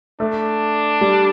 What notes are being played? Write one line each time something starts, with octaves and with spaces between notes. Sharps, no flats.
A3 D4
G3